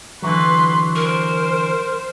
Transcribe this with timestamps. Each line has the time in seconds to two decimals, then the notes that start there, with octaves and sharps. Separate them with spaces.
0.22 D3 E3 F#3 B4 C6
0.96 A#4 C5